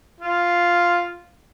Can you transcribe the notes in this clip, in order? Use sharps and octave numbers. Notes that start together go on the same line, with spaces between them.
F4